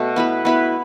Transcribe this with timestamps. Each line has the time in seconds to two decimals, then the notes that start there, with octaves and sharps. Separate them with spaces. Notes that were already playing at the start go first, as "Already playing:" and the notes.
Already playing: B2 A3
0.16 B3 E4 B4
0.45 B3 E4 B4